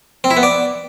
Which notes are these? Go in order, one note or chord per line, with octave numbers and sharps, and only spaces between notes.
C4
E4
B3
D5